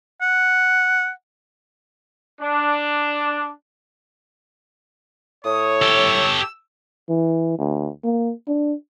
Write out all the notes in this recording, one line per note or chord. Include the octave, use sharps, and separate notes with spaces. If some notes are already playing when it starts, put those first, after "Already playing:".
F#5
D4
A2 C#5 D#6
G4 A4 E6
E3
D2
A#3
D4